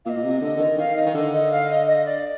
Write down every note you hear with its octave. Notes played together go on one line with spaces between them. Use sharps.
A#2 F5
D#5
A#2
C3
D3
D3
D#3
D#3 F5
D#5
D#3
D3
D#5
F5
D#5
D#5
D5